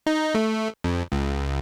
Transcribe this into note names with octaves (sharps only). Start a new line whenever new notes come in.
D#4
A3
F2
C#2